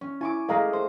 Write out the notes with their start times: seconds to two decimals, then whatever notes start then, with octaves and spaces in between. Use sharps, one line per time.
0.01 C#4
0.21 E4 G#5 C#6 D6
0.49 G#3 A3 G#4 D#5 F5 A#5
0.73 C5